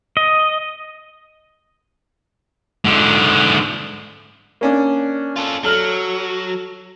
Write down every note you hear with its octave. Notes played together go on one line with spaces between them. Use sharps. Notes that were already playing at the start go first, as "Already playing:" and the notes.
D#5
G#2 D3
A#3 C#4 D4
F4 A4
F#3 A4 F6